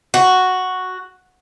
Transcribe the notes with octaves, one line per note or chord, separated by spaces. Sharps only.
F#4